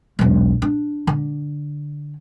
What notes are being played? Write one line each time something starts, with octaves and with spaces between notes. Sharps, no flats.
E1 B1
D4
D3